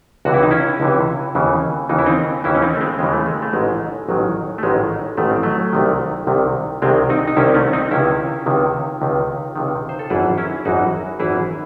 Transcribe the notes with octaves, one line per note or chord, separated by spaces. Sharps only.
C#2 C3 E3 F#4
E4
D#4
C#4 E4
C#2 C3 E3
D#2 C#3 E3
D#2 C#3 E3 D#4
E4
C4 D#4
D#2 C#3 E3 C#4 E4
C#4
C4 D#4
A3
G#3 C4
D#2 C#3 E3 G#3
A3
G#3
A3
A1 G#2 D#3 G#3
A1 G#2 D#3 F#3
A3
A1 G#2 D#3 G#3
A1 G#2 D#3 A3
C4
F#3 A3
C2 C3 D#3
C2 C3 D#3
C2 C3 D#3 G#3 C4
C4 D#4
D#4
C2 C3 D#3 C#4 E4
C4
A3 C#4
C4 D#4
C#2 C3 D#3 C#4 E4
C#2 C3 D#3
C#2 C3 D#3
C#2 C3 D#3
C5
A4
G#1 F#2 E3 E4 G#4
C#4 E4
G#1 F#2 E3 D#4 F#4
G#1 F#2 E3 E4 G#4